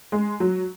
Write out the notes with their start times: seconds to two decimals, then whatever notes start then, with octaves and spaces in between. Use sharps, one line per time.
0.12 G#3
0.40 F#3